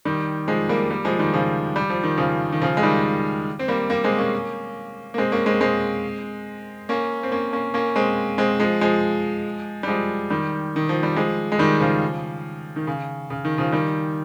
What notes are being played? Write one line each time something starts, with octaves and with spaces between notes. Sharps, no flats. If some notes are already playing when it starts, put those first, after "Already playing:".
D#3 G3
F3 G#3
G3 A#3
G3 A#3
F3 G#3
D#3 G3
C#3 F3
G3
F3
D#3
C#3 F3
D#3
C#3 F3
G#3
D#3 G3
C4
G3 A#3
G3 A#3
G#3 C4
A#3 C#4
A#3
G#3 C4
A#3 C#4
G#3 C4
G#3 C4
A#3 C#4
C4
A#3 C#4
A#3 C#4
A#3 C#4
G#3 C4
G#3 C4
F3 G#3
F3 G#3
G3
F3 G#3
D#3 G3
D#3
F3
G3
F3 G#3
G#3
D#3 G3
C#3 F3
D#3
C#3
C#3
D#3
C#3 F3
D#3 G3